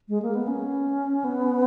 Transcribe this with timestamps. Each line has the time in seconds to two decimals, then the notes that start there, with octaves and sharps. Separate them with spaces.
0.09 G#3
0.22 A#3
0.35 B3
0.48 C#4
1.24 B3